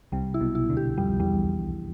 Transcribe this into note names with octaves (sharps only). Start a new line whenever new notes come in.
C2 C3 G3
E4
B1 B2
E4
D2 D3
G4
F2 G3
E2 G3